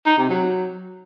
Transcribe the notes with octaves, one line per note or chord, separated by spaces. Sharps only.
D#4
C3
F#3